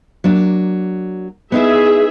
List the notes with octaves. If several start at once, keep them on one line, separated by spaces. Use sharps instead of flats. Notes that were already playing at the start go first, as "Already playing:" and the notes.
F#3 A#3 D4
B3 D#4 E4 G#4 E5